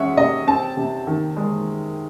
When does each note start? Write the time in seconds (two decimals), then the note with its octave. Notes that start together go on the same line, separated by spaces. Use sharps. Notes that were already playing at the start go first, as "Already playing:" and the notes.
Already playing: G#3 C#4 E5 F#5
0.17 C3 D#5
0.47 C4 A5
0.77 C3
1.07 D#3
1.37 G#3